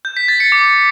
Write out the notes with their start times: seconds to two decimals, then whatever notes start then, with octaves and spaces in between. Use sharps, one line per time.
0.05 G6
0.17 B6
0.28 A6
0.40 C#7
0.52 D6